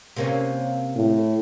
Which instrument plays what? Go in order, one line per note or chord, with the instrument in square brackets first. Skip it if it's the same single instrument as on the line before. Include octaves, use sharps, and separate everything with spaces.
[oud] C3 A#3 C#4
[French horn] A2